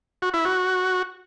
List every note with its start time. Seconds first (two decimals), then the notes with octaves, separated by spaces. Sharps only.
0.22 F#4
0.34 E4
0.45 F#4